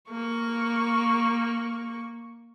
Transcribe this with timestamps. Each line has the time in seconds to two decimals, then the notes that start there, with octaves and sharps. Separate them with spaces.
0.10 A#3 C#6